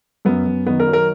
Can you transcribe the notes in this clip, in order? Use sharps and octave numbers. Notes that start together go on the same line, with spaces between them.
F#2 B3
F#2
D#3 B3
A#4
F#3
A#4